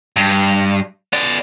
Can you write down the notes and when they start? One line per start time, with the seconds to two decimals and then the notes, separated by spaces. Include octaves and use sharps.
0.16 G2
1.13 B3 D5